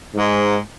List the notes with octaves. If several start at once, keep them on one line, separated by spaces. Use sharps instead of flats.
G#2